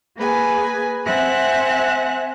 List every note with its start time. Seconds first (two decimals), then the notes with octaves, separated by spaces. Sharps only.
0.17 A#3 G#4 B4 G#5
1.06 C4 E5 F#5 G#5 F#6